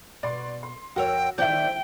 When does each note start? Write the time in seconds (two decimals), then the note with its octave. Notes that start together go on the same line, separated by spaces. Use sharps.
0.23 B2 D5 C6
0.63 C6
0.96 F2 F#4 A#4 C#5 G5 E6
1.38 D#3 C5 D5 E5 G5 G6